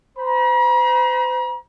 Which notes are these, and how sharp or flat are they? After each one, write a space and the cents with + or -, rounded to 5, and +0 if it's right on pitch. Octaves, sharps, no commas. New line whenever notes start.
C5 -40 A#5 +45